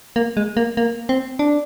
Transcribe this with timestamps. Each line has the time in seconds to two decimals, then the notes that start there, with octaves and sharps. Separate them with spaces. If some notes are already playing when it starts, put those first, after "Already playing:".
0.16 A#3
0.37 G#3
0.57 A#3
0.77 A#3
1.09 C4
1.39 D4